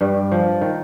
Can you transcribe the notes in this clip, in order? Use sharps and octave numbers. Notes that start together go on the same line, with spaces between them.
G2 G3
F3
D#3